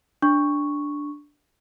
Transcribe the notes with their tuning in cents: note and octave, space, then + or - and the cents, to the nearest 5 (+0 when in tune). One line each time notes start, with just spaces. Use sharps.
D4 +0 C#6 +0